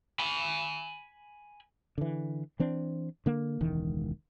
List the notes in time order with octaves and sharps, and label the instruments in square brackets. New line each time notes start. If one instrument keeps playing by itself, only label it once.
[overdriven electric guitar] G#5 B5
[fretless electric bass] D3 E3
E3 C4 D4
D3 A#3
E1 C#2 D#3 E3